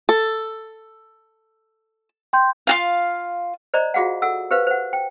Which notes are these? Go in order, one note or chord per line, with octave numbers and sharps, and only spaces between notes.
A4
G5 C6 G6
F4 F#4 F5
C5 D5 D#5 A#5
F4 F#4 G#4 F5 F#5
A4 F#5 E6
G4 B4 C5 F5
C5 F#5
G5